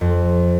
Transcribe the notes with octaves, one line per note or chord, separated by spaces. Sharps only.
F2